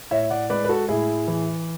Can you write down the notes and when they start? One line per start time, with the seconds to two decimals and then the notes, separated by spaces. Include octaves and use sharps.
0.11 A2 C#5 E5
0.30 D5 F#5
0.50 G#3 B4 D5
0.64 B4
0.69 F#4 A4
0.89 A2 E4 G#4
1.28 E3